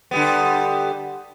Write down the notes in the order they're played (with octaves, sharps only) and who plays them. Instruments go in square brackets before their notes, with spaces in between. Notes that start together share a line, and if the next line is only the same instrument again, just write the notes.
[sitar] D3 G3 B3